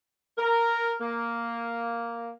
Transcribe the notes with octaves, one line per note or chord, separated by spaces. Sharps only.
A#4
A#3